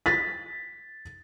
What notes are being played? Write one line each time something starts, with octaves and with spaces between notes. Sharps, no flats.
A6 B6